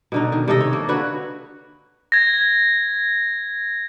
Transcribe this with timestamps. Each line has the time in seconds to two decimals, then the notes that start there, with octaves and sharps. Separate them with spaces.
0.12 B2 D3 D#4
0.32 D#3
0.48 C3 D#4 A4 D#5
0.61 C#5
0.73 A#3
0.89 D3 F#4 B4 C#5
2.12 G#6 A#6